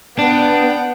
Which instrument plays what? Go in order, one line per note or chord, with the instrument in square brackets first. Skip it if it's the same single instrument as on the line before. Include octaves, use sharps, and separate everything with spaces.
[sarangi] B3 [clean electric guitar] D4 [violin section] F#5 G5